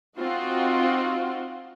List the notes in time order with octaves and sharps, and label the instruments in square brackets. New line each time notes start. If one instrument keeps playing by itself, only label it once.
[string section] C4 D#4 F4 F#4